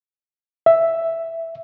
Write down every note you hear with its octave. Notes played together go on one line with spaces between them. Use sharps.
E5